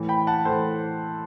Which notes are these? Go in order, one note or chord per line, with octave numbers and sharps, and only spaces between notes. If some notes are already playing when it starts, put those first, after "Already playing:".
Already playing: A2 E3
G5 B5
F#5 A5
A2 E3 A4 C5